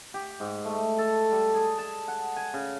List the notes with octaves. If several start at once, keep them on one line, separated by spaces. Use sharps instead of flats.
G4
G#2
A3
A4
G3
G#4
A5
F#5
G#5
C#3